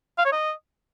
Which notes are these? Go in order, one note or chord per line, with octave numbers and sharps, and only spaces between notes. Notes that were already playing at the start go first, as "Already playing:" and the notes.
F5
C#5
D#5